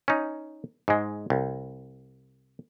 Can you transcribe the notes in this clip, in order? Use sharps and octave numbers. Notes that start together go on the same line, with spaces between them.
C#4 D#4
G#2 G#3
C2